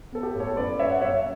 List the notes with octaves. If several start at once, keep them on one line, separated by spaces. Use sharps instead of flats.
B3 A4
G4
A2
A4 C#5
F#2 B4 D5
F#2 C#5 E5
F#5
F#2 C#5 E5
E5